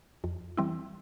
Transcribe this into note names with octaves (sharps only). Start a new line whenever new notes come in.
F2
E3 G3 C4 E4